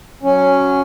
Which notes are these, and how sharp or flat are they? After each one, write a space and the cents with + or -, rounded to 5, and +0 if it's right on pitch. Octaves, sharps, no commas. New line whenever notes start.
F#3 +0 C#4 +0